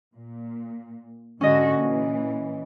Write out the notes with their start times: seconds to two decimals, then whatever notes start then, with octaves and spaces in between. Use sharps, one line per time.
0.16 A#2
1.41 G#2 D3 C#4 F#4 D#5
1.76 A#2 E3